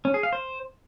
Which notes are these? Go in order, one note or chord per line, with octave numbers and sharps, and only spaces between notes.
C#4
G#4
F5
C5